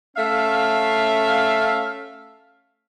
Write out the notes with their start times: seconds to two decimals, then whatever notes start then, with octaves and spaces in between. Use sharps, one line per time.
0.15 A3 C#4 E5 F5